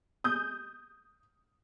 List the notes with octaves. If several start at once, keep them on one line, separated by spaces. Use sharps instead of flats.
D#6 G6